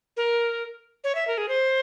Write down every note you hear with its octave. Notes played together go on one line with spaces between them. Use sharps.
A#4
C#5
E5
A#4
G#4
C5